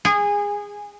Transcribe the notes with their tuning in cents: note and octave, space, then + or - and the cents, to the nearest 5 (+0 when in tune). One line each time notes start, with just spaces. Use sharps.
G#4 -20